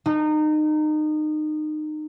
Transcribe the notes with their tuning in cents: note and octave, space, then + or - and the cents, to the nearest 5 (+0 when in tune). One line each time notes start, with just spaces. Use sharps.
D#4 -25